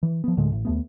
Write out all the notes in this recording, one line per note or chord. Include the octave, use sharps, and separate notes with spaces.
E3
F3 B3
D2 A2 D3 G#3
A1
D#2 A3 B3